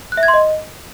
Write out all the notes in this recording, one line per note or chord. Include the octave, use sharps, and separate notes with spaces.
F#6
E5
G#6
C6
D#5